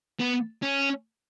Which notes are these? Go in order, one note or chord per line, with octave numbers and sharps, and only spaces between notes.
B3
C#4